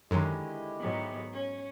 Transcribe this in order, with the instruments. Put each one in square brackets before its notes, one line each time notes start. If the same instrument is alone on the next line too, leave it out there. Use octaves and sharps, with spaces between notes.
[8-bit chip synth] F#2 [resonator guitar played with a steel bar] D3 D#3 G#3 [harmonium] E4 G4 D#5
[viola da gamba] G#2 F#3 B3
C#4